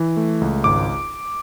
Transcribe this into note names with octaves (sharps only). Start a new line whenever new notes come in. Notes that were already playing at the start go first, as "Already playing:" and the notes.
Already playing: E3
A3
C#2
G#1 D6